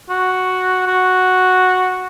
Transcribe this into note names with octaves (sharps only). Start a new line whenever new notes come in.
F#4
F#4